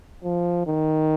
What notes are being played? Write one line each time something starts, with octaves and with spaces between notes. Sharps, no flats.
F3
D#3